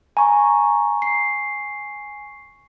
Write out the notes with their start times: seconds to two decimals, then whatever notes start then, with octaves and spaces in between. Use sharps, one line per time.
0.17 G#5 A#5 C#6
1.02 C7